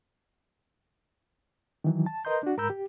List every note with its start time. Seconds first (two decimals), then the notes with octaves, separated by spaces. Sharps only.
1.84 D#3 E3 F#3
2.06 A5
2.25 A#4 B4 D#5 A#5 C6 G6
2.43 D4 F#4
2.57 G#2 A#4 A#5 B5 E6 G6
2.70 G4